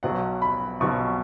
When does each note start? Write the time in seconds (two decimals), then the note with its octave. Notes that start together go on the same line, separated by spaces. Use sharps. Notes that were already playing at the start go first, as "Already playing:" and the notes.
0.03 B1 B2 F#3 F#5
0.42 B5
0.80 B1 B2 F#3 C#6